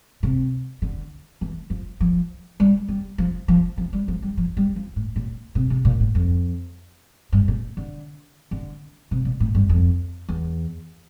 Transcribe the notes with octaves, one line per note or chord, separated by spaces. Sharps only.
C3
D3
E3
F3
F3
G3
G3
F3
F3
F3
G3
F3
G3
F3
G3
F3
A2
A#2
C3
C3
A#2
A2
F2
G2
A#2
D3
D3
C3
A#2
A2
G2
F2
E2